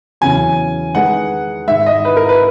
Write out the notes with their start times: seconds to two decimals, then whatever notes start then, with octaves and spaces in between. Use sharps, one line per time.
0.21 E2 C#3 F#3 C#4 G#5
0.94 D#3 G#3 D#4 G#4 B4 F#5
1.67 G#2 D#3 G#3 E5
1.86 D#5
2.05 B4
2.16 A#4
2.29 B4